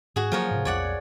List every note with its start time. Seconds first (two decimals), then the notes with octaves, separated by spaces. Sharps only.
0.16 G#2 F#4 G#4
0.32 F3 F#3 A#3 A#4 C#5
0.51 G#2 C3
0.65 B1 F2 C#5 D5 F#5